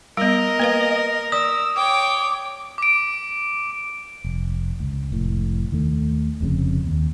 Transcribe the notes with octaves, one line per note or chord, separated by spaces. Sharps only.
G3 B3 A#4 D#5
A#3 B4 F5
D5 D#6 E6
C#5 G5 D6
D6 D7
F1
C#2
F1 A2
D#2 D#3 A3
F1 F2 A#2 C#3
D#2